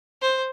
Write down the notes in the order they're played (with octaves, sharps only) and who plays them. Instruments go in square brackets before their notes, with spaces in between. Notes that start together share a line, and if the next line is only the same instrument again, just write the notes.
[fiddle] C5